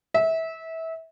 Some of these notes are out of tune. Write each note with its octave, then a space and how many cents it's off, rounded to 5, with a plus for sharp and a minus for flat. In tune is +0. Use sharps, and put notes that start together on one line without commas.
E5 -25